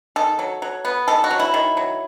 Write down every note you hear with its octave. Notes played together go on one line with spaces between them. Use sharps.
D#3 A4
F#3
F#3
B3
D#3 A4
F#4
F#3
E4
D#3
F#3